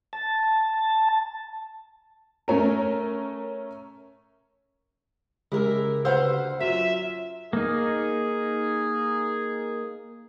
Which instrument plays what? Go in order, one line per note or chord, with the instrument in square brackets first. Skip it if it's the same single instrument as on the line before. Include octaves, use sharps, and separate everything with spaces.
[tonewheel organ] A5
[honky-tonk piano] A3 C#4 A#4
[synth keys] C#3 G4 [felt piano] G#3 [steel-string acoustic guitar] E4 A#4 E5
[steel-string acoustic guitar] D2 C5 F5 [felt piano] B4 F#5 E6
[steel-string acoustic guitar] F#2 F4 [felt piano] F#3 [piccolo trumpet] E5 [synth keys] B6
[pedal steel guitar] A#3 D#4 [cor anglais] G#4